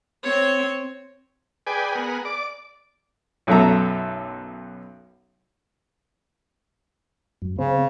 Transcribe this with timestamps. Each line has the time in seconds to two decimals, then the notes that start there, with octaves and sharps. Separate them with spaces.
0.23 C4 C#5
1.67 G#4 B4 D5 G5 G#5
1.95 B3 G#4 A#4 F#5
2.25 D5 D6
3.47 B1 F#2 B3 A4 E5 A#5
7.42 F#2
7.59 C#3 C4